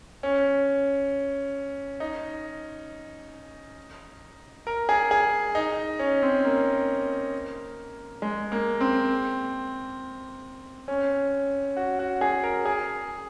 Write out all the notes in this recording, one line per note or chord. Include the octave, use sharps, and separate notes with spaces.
C#4
D#4
A#4
G#4
G#4
D#4
C#4
C4
A#3
G#3
A#3
C4
C#4
F#4
F#4
G#4
A#4
G#4